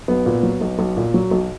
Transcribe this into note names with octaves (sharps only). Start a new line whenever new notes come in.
B1 B3
A#2
F#3
B1
B1
A#2
F#3
B1